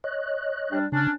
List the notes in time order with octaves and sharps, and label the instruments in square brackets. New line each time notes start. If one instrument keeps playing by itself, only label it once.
[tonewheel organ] C#5 D#5 F#6
[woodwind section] G3 D4
[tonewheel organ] C#3 [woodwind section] C#4 D4